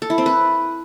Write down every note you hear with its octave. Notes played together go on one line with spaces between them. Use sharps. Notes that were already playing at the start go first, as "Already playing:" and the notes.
A4
E4
C4
B4